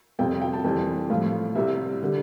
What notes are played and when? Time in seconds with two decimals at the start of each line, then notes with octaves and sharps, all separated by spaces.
0.19 F2 C3 G3 G5
0.42 G5
0.53 A5
0.64 F2 E3 G3
1.10 A2 F3 F5
1.55 C2 C3 G3 E5
2.02 D3 G3